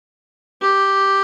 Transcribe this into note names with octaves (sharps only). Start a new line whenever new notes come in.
G4